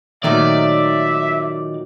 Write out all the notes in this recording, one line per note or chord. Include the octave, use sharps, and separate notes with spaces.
A#2 D#3 F#3 A3 D5 E5